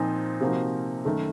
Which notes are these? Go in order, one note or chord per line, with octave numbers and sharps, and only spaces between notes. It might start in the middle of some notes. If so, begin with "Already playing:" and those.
Already playing: A#2 F3 C4 D#4
C3 F3 A#3 D#4 F#4
F#2 D#3 A3